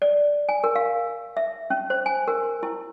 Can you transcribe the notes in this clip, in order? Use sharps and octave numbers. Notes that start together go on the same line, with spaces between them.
D5
G#5
A#4
F5
E5
C#4
C5
G#5
A#4
E4